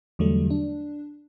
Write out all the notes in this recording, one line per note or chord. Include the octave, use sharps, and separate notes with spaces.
E2 D3 F#3 G3 A3
D4